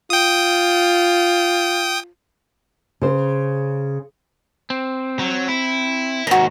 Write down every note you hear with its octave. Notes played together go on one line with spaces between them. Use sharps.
F4 G5 D#6
C#3 C5
C4
F#3
E4
D#2 G#2 F#4 A#5